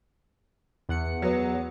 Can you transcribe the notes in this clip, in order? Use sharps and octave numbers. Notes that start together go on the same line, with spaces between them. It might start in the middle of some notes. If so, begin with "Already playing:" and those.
E2 F#5 C#7
F#3 B3